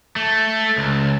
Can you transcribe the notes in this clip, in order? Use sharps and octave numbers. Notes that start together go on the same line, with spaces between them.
A3
C#2